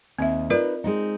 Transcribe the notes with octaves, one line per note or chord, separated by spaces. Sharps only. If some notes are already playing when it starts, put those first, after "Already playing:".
D#2 C4 E5
D#4 F4 A#4 B4 D5
G#3 C4 D#4